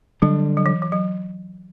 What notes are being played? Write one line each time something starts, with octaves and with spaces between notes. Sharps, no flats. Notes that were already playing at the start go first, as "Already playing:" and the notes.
D3 F#3 G3 D4
F#3
E3
E3
F#3